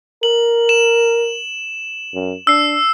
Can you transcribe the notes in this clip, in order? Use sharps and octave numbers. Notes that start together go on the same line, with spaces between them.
A#4 F#7
E7
F#2
D4 E6 C7